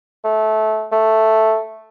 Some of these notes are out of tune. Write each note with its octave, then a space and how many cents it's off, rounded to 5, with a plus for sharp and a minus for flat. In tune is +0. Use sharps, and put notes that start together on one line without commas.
A3 -20
A3 +0